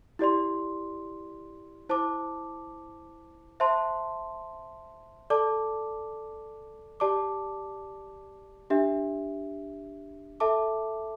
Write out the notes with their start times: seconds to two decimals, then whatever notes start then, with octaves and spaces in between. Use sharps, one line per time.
0.19 E4 G4 D5 C6
1.89 E4 C5 A5 D6
3.60 C5 E5 A5 C6
5.30 A4 D5 A5 D6
7.00 G4 D5 A5 D6
8.70 D4 G4 E5
10.40 A4 E5 A5 D6